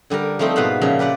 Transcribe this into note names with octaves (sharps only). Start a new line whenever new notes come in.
D3 G3 G4 A#4
F3 G3 A3 C4 D#4
G#2 B2 B3 B4 F5 B5
A#2 C#3 F3 E5
G4 B4 D5 F#5